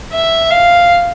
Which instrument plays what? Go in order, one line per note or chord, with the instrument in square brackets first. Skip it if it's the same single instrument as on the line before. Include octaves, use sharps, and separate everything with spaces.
[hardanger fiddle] E5
F5